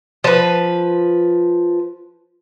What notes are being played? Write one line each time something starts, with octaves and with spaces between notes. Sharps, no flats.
F3 B4